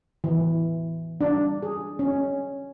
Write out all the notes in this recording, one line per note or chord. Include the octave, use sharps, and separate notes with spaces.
E3
D4
G#4
C#4